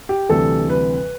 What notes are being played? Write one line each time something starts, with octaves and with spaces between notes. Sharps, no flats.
G4
D2 C3 E3 G3 A4
B4